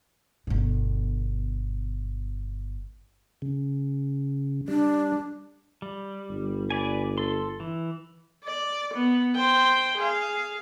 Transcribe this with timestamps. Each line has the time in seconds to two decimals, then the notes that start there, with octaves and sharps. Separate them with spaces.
0.47 G1 B2
3.42 C#3
4.68 G3 D4
5.82 G3
6.29 G1
6.70 B4 D5 G#5
7.18 A4 C6
7.60 E3
8.44 D5
8.94 B3
9.36 C5 G5
9.97 G#4 F5